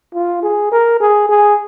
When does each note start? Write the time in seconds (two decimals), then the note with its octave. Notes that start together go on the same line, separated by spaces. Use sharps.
0.14 F4
0.43 G#4
0.72 A#4
1.00 G#4
1.29 G#4